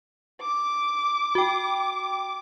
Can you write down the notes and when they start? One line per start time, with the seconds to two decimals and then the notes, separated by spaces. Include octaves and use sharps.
0.41 D6
1.35 F#4 G5